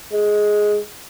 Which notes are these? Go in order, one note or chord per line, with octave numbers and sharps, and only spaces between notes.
G#3